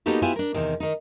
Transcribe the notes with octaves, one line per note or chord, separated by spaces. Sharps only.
A#3 B3 D#4 F#4 G4 A4
B3 E4 F4 G4 G#5
D4 A#4
E2 C3 D#3
D#3 D#4